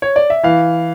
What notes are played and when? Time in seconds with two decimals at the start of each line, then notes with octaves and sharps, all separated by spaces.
0.02 C#5
0.16 D5
0.30 E5
0.43 E3 F5